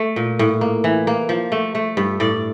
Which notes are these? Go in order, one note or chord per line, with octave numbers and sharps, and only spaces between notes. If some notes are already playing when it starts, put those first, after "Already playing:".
Already playing: A3
A#2
A2
A#3
E3
A#3
F3
A3
A3
G2
A2 D5